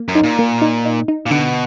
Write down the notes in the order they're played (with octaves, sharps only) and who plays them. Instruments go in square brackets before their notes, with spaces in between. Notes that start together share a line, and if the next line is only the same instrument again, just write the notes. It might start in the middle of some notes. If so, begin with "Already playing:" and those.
Already playing: [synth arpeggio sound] A#3
[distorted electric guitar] F#2
[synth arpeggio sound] D#4
[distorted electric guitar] A#2
[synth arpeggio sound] A#3
D#4
D#4
D#4
[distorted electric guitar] A#2
[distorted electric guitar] B2 [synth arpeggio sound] D3